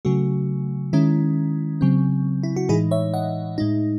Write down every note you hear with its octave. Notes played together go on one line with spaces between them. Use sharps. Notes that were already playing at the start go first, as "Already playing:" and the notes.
C#3 F#3 A3 F#4
D#3 G#3 C#4 E4
C#3 F#3 C4
E4
F#4
A2 E3 G#3 D#4 E4 G#4
C#5 E5
D#5 F#5
A2 G#3 D#4